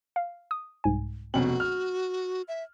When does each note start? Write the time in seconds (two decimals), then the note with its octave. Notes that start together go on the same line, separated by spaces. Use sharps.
0.16 F5
0.51 D#6
0.84 C2 G#2 G#5
1.34 F1 B2 C4 C#4 F#4 F#7
1.60 F6
2.48 E5